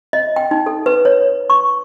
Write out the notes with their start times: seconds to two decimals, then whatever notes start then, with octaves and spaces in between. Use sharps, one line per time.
0.13 D#5
0.36 G5
0.51 D#4
0.66 A4
0.86 B4
1.05 C#5
1.50 C#6